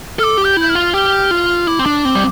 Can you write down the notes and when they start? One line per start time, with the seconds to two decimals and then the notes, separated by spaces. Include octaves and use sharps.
0.19 A4 F6
0.24 D6
0.38 G4
0.45 G6
0.57 E4 G6
0.70 F6
0.75 F4
0.94 G4 F6
1.31 F4
1.67 E4 D6
1.79 C4
1.86 D4
2.05 C4
2.15 G3